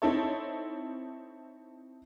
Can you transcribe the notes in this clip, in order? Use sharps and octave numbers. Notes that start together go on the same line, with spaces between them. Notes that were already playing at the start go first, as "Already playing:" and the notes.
C4 D#4 E4 A4 C#5